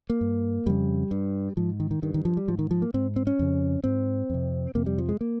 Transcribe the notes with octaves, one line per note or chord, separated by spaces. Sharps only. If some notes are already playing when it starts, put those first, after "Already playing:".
A#3
G2
F2 C#3 G3
G2
G#2 F3
D#3
D#3
G2 D#3
D#3
F3
G3
G#2 F3
D#3
F3
A#3
G#2 C4
C4
C#4
F2 C#3
G#2 C4
F2 C3
F2 C3 A#3
G3
F3
G#3
A#3